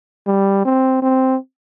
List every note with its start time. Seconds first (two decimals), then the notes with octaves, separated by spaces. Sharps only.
0.27 G3
0.65 C4
1.02 C4